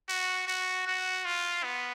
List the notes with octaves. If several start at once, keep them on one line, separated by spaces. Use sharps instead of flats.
F#4
F#4
F#4
F4
B3